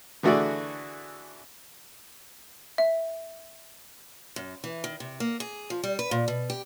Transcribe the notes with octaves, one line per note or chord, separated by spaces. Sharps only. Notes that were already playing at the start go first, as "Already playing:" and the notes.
D3 E3 A3 F#4 G#4 D5
E5
F#2
E3
D#3
C3
A#3
G#4
F3
G3
B4
A#2
B2
G4